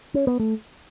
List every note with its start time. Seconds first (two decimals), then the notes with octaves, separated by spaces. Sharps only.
0.14 C#4
0.27 B3
0.40 A3